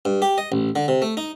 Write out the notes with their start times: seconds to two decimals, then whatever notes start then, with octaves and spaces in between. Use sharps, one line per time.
0.05 G2
0.22 G4
0.38 D#5
0.52 A1
0.76 D3
0.88 C3
1.02 A3
1.17 D#4